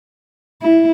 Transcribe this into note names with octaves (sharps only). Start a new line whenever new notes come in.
E4